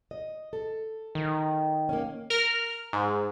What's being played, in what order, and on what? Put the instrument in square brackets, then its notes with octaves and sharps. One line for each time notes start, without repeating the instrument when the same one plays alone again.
[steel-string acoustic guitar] D#5
A4
[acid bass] D#3
[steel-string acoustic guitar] A#3 C#4
[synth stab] A#4 F6
G#2